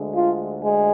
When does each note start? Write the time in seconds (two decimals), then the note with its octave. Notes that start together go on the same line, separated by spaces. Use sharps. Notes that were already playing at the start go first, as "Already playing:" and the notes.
Already playing: D2 D3 G#3
0.12 F4
0.62 G#3